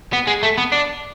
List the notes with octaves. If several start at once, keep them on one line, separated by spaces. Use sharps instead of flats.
B3
G#3
A3
B3
D4